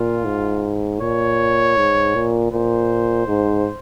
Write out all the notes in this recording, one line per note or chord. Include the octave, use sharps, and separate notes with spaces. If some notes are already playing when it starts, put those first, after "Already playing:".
Already playing: A#2 F4
G#2
A#2 C#5
G#2
A#2
A#2 C5
G#2